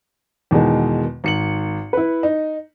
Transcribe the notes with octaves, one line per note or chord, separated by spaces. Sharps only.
E2 B2 D#3 G#3
G#1 C#7 F#7
E4 B4
D#4